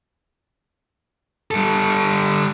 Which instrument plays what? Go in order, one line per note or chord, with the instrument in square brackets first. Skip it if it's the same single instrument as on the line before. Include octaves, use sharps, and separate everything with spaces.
[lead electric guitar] G3 A4